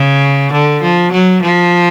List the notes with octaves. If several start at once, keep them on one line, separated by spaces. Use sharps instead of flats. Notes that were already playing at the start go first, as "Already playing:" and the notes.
Already playing: C#3
D3
F3
F#3
F3